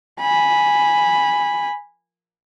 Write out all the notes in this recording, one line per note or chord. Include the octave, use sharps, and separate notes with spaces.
G#5 B5